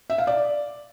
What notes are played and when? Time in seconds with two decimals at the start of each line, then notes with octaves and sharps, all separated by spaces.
0.10 E5
0.18 F5
0.27 D5